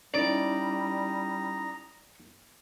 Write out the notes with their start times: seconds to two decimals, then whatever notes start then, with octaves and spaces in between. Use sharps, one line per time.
0.14 G3 C#4 D#4 E4 D5 A#5 D#6 A#6